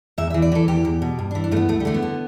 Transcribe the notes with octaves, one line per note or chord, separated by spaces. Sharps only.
E2 E5
E3 E5
D5
E3 A4
E2 G4
E2
B2
G2
D4
E3
D4
G2 A3 B3
D2 A3
G3
D3 A3
B3
D3